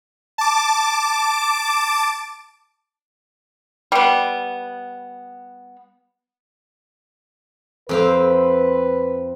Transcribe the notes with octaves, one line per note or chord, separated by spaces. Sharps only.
A5 D6
G3 B3
F2 C4 B4 F5